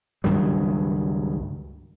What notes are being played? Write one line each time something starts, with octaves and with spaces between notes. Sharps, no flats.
C#2 G2 D#3 F#3